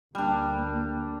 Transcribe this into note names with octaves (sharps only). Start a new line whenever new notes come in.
D2 G3 A#3 D4